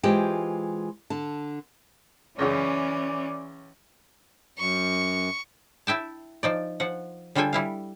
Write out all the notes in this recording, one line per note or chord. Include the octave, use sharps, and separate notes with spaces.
E3 G#3 F4 G4 C5 G5
D3 A5
C#2 F#2 C#3 E3 C#4 D5
F#2 C#6
E4 E5 G5 A5
F3 D#4 D5
F3 F#5
D3 G3 F4 A4 G5 G#5
G3 E4 F5